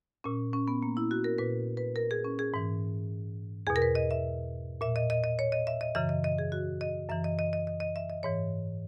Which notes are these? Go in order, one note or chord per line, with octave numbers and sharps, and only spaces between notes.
A#2 C#4
C#4
B3
A#3
E4
F#4
A#4
A#2 B4
B4
A#4
G#4
C#4
G#4
G#2 E3
E2 B2 G#4
A#4
B4
D#5
E5
A#2 E5
D#5
D#5
D#5
C#5
D#5
E5
D#5
F#2 C#3 E3 E5
D#5
D#5
G#4
F#4
D#5
F#2 E3 E5
D#5
D#5
D#5
D#5
D#5
E5
D#5
G#2 E3 C#5